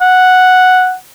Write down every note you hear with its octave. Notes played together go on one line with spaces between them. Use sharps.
F#5